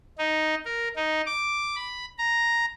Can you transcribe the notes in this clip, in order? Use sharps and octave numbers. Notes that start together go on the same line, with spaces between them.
D#4
A#4
D#4
D6
B5
A#5